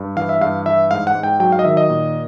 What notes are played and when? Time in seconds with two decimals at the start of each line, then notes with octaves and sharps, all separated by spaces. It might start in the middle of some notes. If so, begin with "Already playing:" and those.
Already playing: G2
0.17 E3 F5
0.29 E5
0.41 G2 F5
0.66 E3 E5
0.91 G#2 F5
1.07 F#5
1.15 G#2
1.23 G5
1.40 F#3 G5
1.52 F5
1.59 D#5
1.65 D#3 E5
1.77 D#5
1.90 A#2